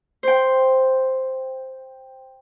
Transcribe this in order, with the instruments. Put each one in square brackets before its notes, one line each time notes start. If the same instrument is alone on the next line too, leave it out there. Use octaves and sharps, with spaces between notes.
[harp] C5 G5